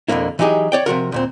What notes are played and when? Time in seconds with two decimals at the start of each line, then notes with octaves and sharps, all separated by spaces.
0.08 F2 B2 D3 A#3 E4
0.39 E3 F#3 D#4 G4 G#4
0.72 C#5 D5 G5
0.86 C3 F3 F#4 A#4
1.12 D2 A#2 C4